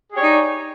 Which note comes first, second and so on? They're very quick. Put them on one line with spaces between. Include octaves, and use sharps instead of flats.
G#4 G4 C#5 D5 D#4